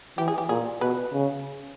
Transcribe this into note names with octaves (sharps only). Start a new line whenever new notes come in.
E3 G4
G#4
G4
A#2 G#4
B2 B4
C#3